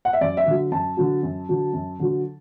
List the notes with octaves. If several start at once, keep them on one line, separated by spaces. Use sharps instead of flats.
F#5
E5
F#2 D5
E5
D3 F#3
F#2 A5
D3 F#3
F#2
D3 F#3
F#2
D3 F#3